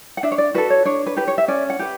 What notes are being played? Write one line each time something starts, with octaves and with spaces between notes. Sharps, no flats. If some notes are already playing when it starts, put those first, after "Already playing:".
F#5
D4 E5
C#5
D5
F#4 A4 B4
C#5
D4 C#5
B4
G4 B4
C#5
E5
C#4 D5
F#5
G4 B4